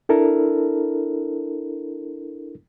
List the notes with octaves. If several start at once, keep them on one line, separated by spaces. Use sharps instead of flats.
D4 E4 A4 A#4